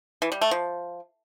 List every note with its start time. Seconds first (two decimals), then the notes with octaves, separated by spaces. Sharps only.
0.22 E3
0.32 G3
0.41 A3
0.51 F3